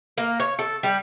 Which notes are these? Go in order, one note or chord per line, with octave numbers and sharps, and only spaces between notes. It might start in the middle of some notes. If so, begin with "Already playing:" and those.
A#3
C#5
A4
G3